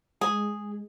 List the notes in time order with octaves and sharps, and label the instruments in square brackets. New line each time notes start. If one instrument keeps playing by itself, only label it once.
[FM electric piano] G#3 [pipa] G#4